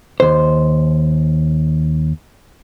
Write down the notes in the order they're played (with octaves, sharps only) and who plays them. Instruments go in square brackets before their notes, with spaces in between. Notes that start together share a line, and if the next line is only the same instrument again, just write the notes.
[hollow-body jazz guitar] D#2 C5